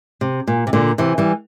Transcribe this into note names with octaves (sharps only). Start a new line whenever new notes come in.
C3
A#2
C3
A#2 D3
C3 E3
E3 G3